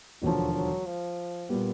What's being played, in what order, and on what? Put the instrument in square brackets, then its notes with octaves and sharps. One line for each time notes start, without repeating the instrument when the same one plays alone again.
[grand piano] E1 D#2 D3 F3 [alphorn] F#3
[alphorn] F#3
F3
[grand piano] A#2 G3 B3